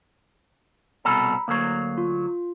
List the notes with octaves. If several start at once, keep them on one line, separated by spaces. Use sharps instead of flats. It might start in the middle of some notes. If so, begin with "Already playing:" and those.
C2 B2 A4 A#5 B5
D2 F#3 A#3 C7
F4